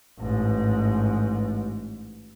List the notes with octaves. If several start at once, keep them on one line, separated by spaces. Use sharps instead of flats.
A1 G#2